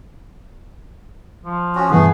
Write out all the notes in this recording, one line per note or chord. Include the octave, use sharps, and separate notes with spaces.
F3
C#4 F#4
G2 B2 E3 A3 B3 G#4